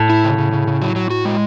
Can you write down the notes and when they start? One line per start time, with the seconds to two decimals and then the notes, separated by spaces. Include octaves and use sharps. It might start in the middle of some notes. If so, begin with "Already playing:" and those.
Already playing: A2
0.10 E4
0.24 C#3
0.38 C#3
0.53 C#3
0.67 C#3
0.82 F#3
0.96 F#3
1.10 F#4
1.25 G#3